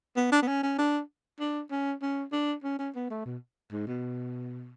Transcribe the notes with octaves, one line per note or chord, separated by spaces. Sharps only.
B3
D4
B3
C#4
C#4
D4
D4
C#4
C#4
D4
C#4
C#4
B3
A3
B2
G#2
B2